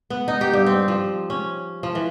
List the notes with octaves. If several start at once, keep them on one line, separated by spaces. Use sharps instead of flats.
B3
D#4
G4
G2
C4
F3
C#4
F3
E3